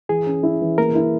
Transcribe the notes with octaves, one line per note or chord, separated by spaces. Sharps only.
E3 G#4
C#4
E4
E3
A#3 A#4
E4